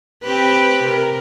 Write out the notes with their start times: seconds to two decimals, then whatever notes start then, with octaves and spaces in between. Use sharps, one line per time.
0.23 C4 G4 B4
0.83 C3 A#4